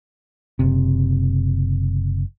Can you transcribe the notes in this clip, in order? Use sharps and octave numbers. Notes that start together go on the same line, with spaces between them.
F#1 C3